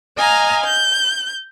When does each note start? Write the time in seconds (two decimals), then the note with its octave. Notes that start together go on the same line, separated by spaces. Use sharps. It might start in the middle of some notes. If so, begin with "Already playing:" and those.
0.17 D#5 F5 G#5 A#5
0.64 G6